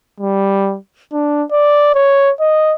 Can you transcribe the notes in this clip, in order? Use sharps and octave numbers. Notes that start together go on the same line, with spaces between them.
G3
D4
D5
C#5
D#5